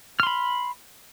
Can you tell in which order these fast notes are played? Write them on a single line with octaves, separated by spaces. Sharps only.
F6 C6 B5